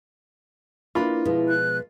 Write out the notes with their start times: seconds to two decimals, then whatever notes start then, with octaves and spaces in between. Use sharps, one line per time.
0.95 A#3 D4 E4 F4 B4 B5
1.25 B2 F3 G#3
1.49 F#6